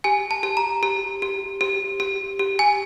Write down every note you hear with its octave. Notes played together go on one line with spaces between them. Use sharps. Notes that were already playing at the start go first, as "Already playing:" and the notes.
G4 G#5
A5
G4
A#5
G4
G4
G4
G4
G4
G#5